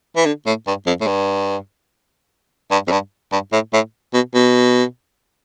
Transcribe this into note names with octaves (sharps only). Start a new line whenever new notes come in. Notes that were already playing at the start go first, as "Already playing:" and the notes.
E3
D3
A2
G2
F2
A2
G2
G2
F2
G2
G2
A2
A2
B2
B2